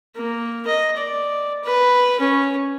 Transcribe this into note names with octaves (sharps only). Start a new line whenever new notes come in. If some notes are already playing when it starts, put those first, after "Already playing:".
A#3
D#5
D5
B4
C#4